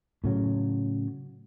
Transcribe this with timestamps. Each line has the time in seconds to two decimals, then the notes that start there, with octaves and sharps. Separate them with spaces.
0.24 A2 C#3 F#3